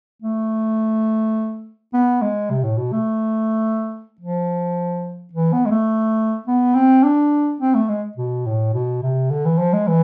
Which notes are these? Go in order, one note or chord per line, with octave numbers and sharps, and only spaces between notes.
A3
B3
G#3
C3
A2
B2
A3
F3
E3
B3
G#3
A3
B3
C4
D4
C4
A3
G#3
B2
A2
B2
C3
D3
E3
F3
G#3
E3